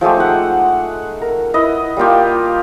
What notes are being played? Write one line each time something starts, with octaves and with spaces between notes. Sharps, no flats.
F3 G#3 A3 G4
D#4 F#5
A#4
E4 B4 D#5
G3 A#3 F4 G4